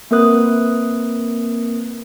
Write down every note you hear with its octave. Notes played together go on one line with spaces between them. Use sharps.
A#3 C4 A#4 B4 D#6 F#6